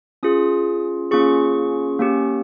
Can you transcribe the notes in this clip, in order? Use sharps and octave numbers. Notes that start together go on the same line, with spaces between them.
C#4 F4 G#4 D#6
A#3 C#4 F4 G#4 C#6
A#3 C#4 G4